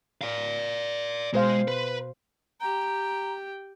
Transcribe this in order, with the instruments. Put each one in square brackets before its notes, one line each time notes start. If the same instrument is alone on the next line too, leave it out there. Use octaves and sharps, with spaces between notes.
[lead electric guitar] D5 F5
[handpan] B2 C5 F5 [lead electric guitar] G#3
[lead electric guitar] B4
[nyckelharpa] G4 G5 [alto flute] A#5